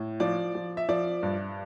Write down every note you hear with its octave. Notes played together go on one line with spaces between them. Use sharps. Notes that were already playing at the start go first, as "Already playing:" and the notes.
Already playing: A2
F3 D5
F3
E5
F3 D5
G2